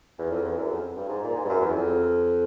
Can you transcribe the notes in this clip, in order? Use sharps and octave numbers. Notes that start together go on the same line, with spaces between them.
E2
F2
E2
F#2
F2
G2
G#2
A#2
G#2
G2
F#2
E2
F2